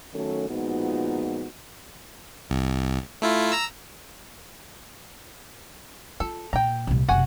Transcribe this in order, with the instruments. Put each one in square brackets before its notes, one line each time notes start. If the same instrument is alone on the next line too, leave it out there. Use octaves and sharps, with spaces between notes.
[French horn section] D#3 F#3 A3 C#4 A4
A#2 F3 G#3 B3 D#4 F#4
[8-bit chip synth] C2
A3 E4 F4
A#5 E6
[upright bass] F4 [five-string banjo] A4
[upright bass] A#2 [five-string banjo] G5 A#5
[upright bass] C2 A#2
[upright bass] F#1 C3 [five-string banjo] F#4 F#5 G#5